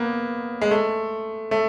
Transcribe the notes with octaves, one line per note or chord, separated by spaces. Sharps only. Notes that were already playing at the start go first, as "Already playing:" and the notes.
Already playing: A#3 B3
G#3
A3
A3